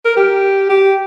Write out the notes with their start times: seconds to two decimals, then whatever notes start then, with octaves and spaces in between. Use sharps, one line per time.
0.05 A#4
0.17 G4
0.69 G4